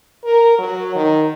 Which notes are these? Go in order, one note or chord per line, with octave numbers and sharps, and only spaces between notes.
A#4
F#3
D#3